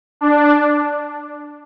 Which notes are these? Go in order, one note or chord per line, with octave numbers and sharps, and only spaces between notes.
D4